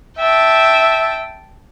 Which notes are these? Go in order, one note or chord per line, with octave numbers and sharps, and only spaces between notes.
E5 G5 A5